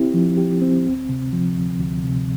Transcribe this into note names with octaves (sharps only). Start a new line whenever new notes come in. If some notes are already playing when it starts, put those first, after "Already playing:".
Already playing: C4 E4 G4
F3
G4
C4
D2
C3
F3
D2
D2
C3